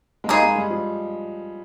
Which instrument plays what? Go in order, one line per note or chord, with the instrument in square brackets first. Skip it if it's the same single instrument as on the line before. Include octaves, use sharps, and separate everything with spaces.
[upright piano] G#3
[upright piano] G3 [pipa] A#3 D#4 G#4
[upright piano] G#3
G3
F3